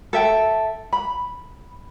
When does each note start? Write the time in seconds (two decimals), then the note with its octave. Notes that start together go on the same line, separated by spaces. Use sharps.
0.13 A4 E5 G5
0.93 B5